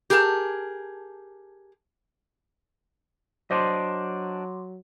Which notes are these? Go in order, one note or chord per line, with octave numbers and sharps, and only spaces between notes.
G4 G#4 A#4 G#5 A5
F#3 D4 C5 D#5 C6 D6